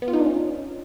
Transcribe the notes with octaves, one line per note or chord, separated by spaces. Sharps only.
B3
F4
D#4
D4
C#4